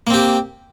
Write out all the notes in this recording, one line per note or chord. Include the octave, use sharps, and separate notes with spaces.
A#3 C4 G4